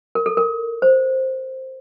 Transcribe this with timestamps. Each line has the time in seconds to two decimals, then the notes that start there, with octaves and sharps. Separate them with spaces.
0.15 A#4
0.26 A4
0.37 A#4
0.82 C5